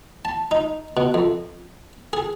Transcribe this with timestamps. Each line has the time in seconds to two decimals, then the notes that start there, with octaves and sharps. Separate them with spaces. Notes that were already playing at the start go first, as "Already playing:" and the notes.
0.25 A5
0.51 D#4
0.97 B2
1.14 F2
2.13 G#4